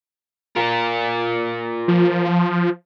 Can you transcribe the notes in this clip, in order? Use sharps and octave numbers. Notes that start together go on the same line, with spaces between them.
F4 A#4
F3